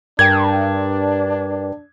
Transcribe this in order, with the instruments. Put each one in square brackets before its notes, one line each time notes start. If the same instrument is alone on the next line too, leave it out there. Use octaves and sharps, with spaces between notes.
[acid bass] G2 [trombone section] D4 [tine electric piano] A#4 D5 G5 [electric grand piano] G#6